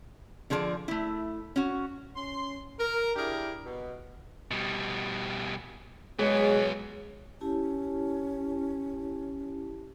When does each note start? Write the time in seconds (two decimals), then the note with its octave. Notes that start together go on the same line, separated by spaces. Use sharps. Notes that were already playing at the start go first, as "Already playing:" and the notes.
0.50 D3 F3 G#4 C5 D5
0.88 A3 E4
1.56 C#4 F#4
2.16 C#4 C6
2.79 A#4
3.16 D4 E4 G4 G#4 A#4
3.65 B2
4.51 B2 G3
6.19 F#3 G#3 B3 G#4 C#5
7.41 C#4 E4 G4 A5